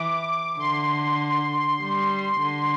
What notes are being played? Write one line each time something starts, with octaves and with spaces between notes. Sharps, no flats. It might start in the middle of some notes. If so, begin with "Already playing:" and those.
Already playing: E3 D6
D3 C6
G3
D3